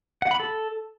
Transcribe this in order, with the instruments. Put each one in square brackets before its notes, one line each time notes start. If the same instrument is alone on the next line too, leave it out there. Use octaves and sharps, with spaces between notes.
[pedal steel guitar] F#5
B5
A4